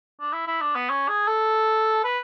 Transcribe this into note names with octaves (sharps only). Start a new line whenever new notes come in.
D4
E4
E4
D4
B3
C#4
G#4
A4
B4